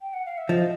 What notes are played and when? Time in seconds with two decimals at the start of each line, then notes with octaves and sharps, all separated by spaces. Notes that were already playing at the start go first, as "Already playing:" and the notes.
0.01 G5
0.14 F#5
0.26 F5
0.38 E5
0.49 F3 D#5